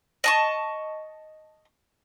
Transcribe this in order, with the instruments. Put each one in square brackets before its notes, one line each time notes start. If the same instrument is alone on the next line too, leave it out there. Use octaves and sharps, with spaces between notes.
[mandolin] D#5 A5 C#6